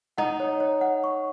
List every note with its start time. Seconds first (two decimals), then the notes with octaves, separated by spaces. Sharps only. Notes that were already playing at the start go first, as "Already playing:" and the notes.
0.18 D#4 F#5
0.40 C#5
0.60 C#5
0.81 F#5
1.04 C#6